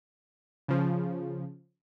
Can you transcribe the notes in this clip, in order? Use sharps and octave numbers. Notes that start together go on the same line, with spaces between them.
C#3 F3